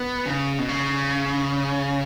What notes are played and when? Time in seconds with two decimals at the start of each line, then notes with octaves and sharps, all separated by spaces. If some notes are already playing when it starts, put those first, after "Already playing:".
Already playing: B3
0.26 C#3
0.59 B2
0.69 C#3